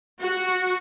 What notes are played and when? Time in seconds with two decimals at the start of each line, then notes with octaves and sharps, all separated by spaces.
0.20 F#4